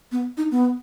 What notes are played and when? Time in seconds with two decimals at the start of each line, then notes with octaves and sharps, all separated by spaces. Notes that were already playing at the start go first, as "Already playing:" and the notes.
0.12 B3
0.37 D#4
0.51 B3